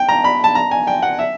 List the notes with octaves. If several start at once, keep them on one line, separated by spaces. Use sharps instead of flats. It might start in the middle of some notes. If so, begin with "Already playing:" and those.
Already playing: G5
A#5
B5
A5
A#5
G#5
G5
F#5
E5